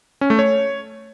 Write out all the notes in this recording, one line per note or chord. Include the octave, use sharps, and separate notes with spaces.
C#4
A3
C#5